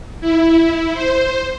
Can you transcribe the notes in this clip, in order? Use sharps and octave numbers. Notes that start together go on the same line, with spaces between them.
E4
C5